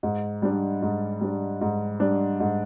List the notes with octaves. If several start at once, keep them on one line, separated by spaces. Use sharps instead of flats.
G#2
G3 D4
G#2
G3 D4
G#2
G3 D4
G#2